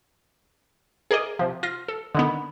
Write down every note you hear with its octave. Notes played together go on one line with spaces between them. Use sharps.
G#4 A#4 D5 D#5
C3 F3
F4 A#6
A4
D3 D#3 B3